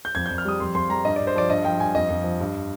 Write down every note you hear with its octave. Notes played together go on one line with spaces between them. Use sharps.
G6
F2 G#6
G6
F2
F6
G3 D#6
F2 C6
F2 C6
G3 A#5
G2 D#5
D5
G2
C5
F3 D5
G2 D#5
F3 G5
G2 G#5
F2 D#5
F2
F3
G2